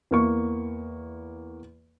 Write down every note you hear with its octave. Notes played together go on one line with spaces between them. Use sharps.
E2 A#3 C#6